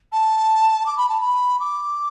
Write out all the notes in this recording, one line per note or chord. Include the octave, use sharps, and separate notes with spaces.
A5
D6
B5
A5
B5
D6